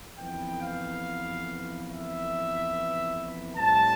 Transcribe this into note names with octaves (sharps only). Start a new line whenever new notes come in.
F2 E3 B3 G5
F5
E5
A2 G3 C4 A5